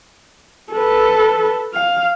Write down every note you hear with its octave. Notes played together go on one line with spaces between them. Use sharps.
A4 B4
F5